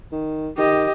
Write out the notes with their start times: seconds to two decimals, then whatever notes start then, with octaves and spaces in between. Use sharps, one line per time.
0.12 D#3
0.58 D#3 G4 D#5